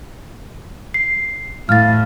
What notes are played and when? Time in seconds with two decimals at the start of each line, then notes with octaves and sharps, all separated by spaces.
0.94 C7
1.69 A2 F5 F6 A6